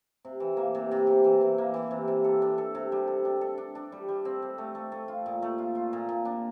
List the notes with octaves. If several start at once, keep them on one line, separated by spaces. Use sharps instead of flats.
C3
E3
A#3
C3
C3
C3
E3
E3
A#3
E3
C3
C3
A4
D4
A4
C3
G3
A4
D4
A4
D4
D4
G3
G3
C4
C4
A3
A3
A3
F4
A#2
A3
F4
F4
A#2
A#2
D4